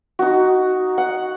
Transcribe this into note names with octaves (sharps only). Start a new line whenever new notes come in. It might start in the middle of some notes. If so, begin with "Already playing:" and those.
D#4 F#4
F#5